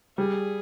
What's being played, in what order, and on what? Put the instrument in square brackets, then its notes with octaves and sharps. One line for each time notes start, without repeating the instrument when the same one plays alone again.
[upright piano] G3 [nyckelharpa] G#4